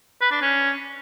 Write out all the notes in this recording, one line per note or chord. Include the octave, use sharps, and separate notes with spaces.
B4
D4
C#4